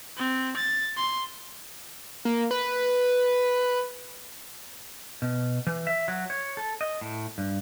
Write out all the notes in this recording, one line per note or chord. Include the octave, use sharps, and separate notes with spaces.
C4
A6
C6
A#3
B4
B2
E3
E5
F#3
C#5
A4
D#5
A2
G2